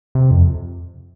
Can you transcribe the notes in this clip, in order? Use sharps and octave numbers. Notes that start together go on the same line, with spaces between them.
C3
F2